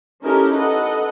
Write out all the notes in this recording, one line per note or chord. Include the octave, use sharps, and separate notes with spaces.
C#4 D#4 E4 G4 A4 A#4
A4 B4 D#5 F#5